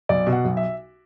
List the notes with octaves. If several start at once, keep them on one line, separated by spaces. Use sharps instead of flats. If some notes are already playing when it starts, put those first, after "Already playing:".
B1 D5
B2
F#5
B1
E5